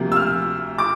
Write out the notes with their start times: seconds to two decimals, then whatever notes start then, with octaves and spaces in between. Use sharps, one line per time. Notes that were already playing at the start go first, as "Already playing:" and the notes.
Already playing: D2 C3 F3 A#3
0.12 E6
0.16 F6
0.78 D6